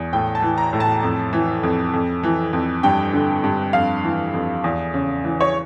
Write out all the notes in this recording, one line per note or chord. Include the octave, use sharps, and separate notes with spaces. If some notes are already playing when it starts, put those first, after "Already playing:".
Already playing: E2
A2 G5
A5
E3
A#5
A2
A5
F2
E3
F2
F2
E3
F2
G2 G5
D3
G2
F2 F5
E3
F2
E2
C#3
E3
C#5